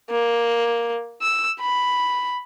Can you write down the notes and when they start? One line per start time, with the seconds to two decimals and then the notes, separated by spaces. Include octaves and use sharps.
0.10 A#3
1.22 E6
1.60 B5